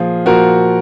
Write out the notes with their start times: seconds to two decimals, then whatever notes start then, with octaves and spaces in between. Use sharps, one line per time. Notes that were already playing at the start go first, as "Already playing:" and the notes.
Already playing: A#2 F3 F4 G#4
0.26 A#2 F3 F#4 A#4